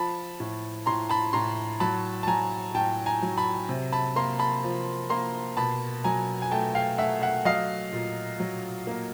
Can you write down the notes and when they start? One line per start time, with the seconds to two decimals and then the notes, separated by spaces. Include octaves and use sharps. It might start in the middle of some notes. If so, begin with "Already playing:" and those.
Already playing: F3 A5 B5
0.40 A2
0.86 A2 A#5 C6
1.09 A5 B5
1.33 A2 A#5 C6
1.80 F#3 A5 B5
2.23 A5
2.27 F#3 G#5 A#5
2.75 A2 G5 A5
3.06 G#5 A#5
3.22 F#3
3.38 A5 B5
3.69 C3
3.93 A5 B5
4.16 A#3 A#5 C6
4.39 A5 B5
4.63 F3
5.10 A#3 A#5 C6
5.57 B2 A5 B5
6.04 F#3 G#5 A#5
6.42 G#5
6.51 A3 G5 A5
6.75 F5 G5
6.98 A3 E5 F#5
7.22 E5 F#5
7.45 F#3 D#5 F5
7.93 A#2
8.40 F#3
8.87 A#3